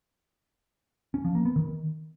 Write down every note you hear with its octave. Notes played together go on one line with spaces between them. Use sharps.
C#4
F3
A#3
B3
D#3